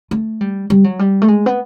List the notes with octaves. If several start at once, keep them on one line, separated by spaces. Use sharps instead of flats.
A3
G3
G3
F#3
G3
A3
G#3
B3